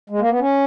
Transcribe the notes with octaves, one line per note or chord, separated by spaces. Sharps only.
G#3
A#3
B3
C#4